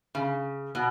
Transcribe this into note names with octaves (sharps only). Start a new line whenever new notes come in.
C#3
B2